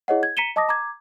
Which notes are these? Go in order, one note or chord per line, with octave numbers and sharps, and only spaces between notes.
E4 G#4 C#5 D#5 F#5
G#6
A#5 B6 C#7 D#7 E7 G7
D#5 A5 D6 D#6 A#6
A#5 D6 G#6